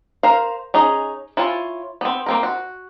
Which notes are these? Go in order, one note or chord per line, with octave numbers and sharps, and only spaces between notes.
A#4 C5 F5
C#4 D#4 G#4
E4 F4 C#5 G#5
B3 C4
A#3 C4 A#4
F#4